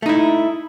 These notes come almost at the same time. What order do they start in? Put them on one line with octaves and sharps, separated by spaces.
A3 D#4 E4